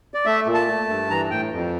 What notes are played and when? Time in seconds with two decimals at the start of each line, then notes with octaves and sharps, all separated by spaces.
0.14 D5
0.26 A3 E5
0.46 A#2
0.54 A5
0.67 A3
0.89 G2
1.10 E3 A#5
1.30 A2 G5
1.52 F2